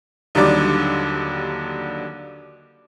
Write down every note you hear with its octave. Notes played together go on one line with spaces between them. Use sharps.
D#2 D3 F#3 G3 D#4 D6